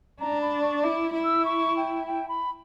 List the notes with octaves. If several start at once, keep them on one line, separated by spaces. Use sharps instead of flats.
D4 A#5
B5
C#6
E4 D6
E4
E6
C#6
G5
G5
B5